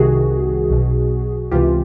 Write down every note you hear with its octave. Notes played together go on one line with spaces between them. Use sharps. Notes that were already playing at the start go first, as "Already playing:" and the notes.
Already playing: C2 C3 D#3 F#4 G#4
B1 B2
C#2 C3 E3 F4 G4